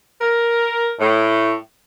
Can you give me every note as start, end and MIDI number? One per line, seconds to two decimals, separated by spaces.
0.21 0.91 70
0.99 1.54 45